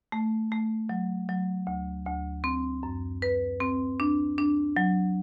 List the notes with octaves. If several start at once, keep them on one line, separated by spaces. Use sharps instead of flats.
A3
A3
F#3
F#3
D2
D2
C4
F#2
B4
C4
D4
D4
F#3